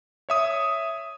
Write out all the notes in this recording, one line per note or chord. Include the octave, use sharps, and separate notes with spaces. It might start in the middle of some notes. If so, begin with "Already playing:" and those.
C#5 E5 D#6